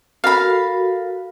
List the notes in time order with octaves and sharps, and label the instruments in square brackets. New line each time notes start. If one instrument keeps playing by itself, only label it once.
[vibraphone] F#4 A4 A#4 [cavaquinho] F5 B5